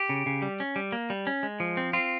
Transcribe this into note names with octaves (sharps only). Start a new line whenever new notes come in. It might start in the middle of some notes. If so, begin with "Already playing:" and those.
Already playing: G4
C#3
C#3
G3
C#4
G3
A#3
G3
C#4
G#3
F3
C4
C4 F4